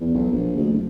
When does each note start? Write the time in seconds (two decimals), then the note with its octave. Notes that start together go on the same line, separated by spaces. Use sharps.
0.01 E2
0.14 B1
0.31 A#1
0.56 D2
0.72 F#1